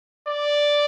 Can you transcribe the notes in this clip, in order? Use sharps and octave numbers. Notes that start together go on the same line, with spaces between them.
D5